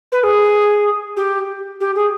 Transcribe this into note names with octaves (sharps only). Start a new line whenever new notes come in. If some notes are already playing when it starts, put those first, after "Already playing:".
B4
G#4
G4
G4
G#4